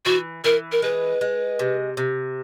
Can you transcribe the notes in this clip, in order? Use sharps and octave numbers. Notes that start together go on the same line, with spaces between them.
E3 F#4
E3 A#4
A#4
G#3 B4
G#3
C3
C3